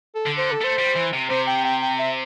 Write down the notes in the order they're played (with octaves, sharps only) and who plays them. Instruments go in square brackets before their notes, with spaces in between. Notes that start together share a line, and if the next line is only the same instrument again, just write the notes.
[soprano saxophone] A4
[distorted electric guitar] D3
[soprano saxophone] C5
A4
[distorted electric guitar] A3 [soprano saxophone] C5
[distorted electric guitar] G3
E3
C3
[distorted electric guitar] C3 [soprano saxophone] C5
[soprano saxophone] G5
G5
G5
E5